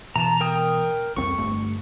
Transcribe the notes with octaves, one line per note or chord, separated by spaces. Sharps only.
B2 E3 A5 A#5
A#4 G5 D#6
C2 F2 C4 C#6
G1 G2 A3